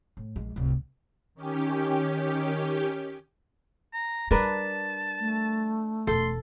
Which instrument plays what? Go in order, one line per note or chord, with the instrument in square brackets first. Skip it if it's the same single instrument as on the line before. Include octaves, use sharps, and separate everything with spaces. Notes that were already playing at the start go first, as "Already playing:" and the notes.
[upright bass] A2
A#1 G#3
D1 C2
[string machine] D#3 C#4 G4
[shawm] A#5
[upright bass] G3 [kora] D4 A#4 B4 [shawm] A5
[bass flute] A3
[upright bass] E1 [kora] A4 [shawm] C6